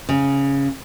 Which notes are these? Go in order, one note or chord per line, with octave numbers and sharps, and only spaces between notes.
C#3